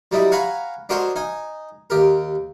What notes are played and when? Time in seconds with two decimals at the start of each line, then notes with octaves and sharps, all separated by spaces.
0.12 F#3 G3 D#4 E4
0.32 C#5 F5 F#5 G#5 A#5 B5
0.89 D4 F#4 A#4 C5 C#5 D#5
1.16 D#4 G#5
1.90 D#2 G4 A#4